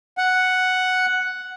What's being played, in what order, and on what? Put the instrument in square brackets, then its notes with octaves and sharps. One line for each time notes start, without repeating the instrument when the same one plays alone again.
[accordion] F#5